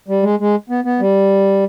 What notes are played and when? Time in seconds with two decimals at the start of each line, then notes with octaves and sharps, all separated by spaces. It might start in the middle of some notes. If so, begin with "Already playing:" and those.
0.08 G3
0.23 G#3
0.39 G#3
0.69 B3
0.84 B3
1.00 G3